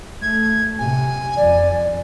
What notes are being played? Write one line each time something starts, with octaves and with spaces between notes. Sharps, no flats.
A3 G#6
C3 G#5
F2 D5